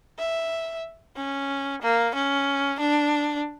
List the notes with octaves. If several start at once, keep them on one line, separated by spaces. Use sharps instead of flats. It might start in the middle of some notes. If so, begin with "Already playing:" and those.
E5
C#4
A#3
C#4
D4